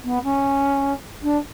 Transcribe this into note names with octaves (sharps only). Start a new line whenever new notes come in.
B3
C#4
D4